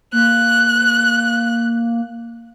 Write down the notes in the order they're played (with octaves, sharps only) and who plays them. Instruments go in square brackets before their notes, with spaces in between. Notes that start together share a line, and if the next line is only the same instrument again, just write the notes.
[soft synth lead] A#3 [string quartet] F#6